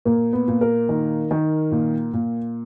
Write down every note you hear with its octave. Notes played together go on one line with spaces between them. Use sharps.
A#2 A#3
B3
A#2
A#4
D#3
D#3
A#2
A#2